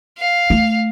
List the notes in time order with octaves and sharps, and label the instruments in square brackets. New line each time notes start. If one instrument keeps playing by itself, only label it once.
[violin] F5
[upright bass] A3